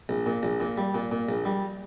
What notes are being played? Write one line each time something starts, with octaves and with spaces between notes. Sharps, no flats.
A#1
A#2
A#1
A#2
G3
A#2
A#2
A#1
G3